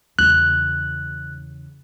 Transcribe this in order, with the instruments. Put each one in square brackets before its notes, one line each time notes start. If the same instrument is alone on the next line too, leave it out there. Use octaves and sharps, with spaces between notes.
[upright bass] E2 C#3 [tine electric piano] F#6